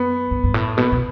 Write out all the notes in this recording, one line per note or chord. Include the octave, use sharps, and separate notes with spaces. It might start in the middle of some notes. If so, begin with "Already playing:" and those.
Already playing: F#2 B3
G2
G2
A2
B2 B3
B2